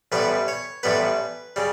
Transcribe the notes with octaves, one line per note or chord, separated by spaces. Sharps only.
A1 A2 G3 B3 B4
C#5
A1 A2 G3 B3 B4
C#3 G3